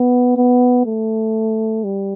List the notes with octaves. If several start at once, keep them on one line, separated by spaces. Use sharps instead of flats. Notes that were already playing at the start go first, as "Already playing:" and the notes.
Already playing: B3
B3
A3
G3